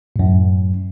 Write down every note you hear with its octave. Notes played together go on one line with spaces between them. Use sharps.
F#2 A2